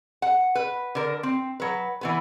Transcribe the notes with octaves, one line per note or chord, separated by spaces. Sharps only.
F#5
B4
D3 A#4
C4
F#3 B4
E3 B3 B4